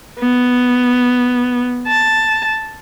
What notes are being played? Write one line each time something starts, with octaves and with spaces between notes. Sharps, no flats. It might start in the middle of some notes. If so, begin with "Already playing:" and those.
B3
A5